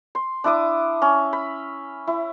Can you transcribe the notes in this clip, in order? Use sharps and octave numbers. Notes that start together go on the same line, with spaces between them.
C6
D4 E4 D6 D#6
C#4
B5
E4